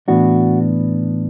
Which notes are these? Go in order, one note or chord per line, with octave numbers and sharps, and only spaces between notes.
A2 E3 B3 D4 F#4